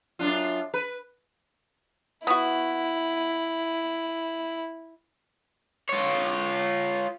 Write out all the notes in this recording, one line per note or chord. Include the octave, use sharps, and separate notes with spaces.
F#2 D4 F4
B4
B3 E4 F#4
F4 C#5